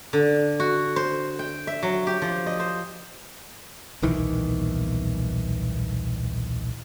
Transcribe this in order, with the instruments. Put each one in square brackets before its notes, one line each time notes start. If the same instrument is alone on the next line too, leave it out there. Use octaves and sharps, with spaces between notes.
[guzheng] D3
F#4
C5
G5
E5
F#3
G4
F3
D#5
C5
[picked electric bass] D#1 B1 D#3 E3